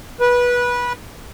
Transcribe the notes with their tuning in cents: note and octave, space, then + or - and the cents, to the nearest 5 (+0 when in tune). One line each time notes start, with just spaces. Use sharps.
B4 -20